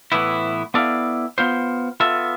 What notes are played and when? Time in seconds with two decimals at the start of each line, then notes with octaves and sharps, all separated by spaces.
0.12 A2 E3 B3 E4
0.74 B3 E4 A4 D5 F5
1.38 B3 F4 C5
2.00 B3 F4 A4 E5